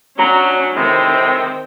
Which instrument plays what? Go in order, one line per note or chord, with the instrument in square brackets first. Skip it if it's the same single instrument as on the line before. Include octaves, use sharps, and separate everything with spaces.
[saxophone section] F#3 [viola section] C#4 D4 F#4 [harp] A#5
[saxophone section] A2 C3 G#3 [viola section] D#3 C4 G5